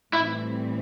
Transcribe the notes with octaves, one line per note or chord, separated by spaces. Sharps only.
A2 E3 G3 C4 E4